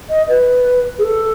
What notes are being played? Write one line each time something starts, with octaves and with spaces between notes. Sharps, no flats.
D#5
B4
G#4
A4